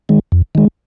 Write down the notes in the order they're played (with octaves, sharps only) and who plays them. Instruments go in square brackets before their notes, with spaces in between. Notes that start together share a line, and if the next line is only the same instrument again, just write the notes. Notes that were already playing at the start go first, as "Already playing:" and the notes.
[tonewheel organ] D#3 G#3
F2
D#3 G#3